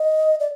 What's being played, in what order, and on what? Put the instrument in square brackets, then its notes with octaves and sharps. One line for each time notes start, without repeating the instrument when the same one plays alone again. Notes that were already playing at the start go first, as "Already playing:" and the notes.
Already playing: [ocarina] D#5
D5